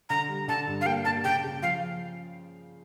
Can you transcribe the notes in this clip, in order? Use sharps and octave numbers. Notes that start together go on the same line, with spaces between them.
D3 A#5
G3
D3 A5
G2
F5
A#3 G5
A#3 A5
C#3 G5
C#3
F3 F5